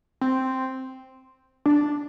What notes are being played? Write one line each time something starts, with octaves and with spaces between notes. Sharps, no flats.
C4
D4